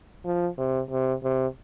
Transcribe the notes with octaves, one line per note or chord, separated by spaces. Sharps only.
F3
C3
C3
C3